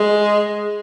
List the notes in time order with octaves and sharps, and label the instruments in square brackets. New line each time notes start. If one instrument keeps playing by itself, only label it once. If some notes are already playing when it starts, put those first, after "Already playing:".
Already playing: [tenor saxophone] G#3